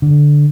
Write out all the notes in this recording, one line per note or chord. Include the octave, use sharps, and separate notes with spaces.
D3